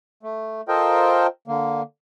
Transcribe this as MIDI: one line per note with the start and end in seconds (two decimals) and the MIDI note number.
0.23 0.61 57
0.68 1.27 65
0.68 1.27 69
0.68 1.27 70
0.68 1.27 72
0.68 1.27 75
0.68 1.27 79
1.48 1.82 50
1.48 1.82 58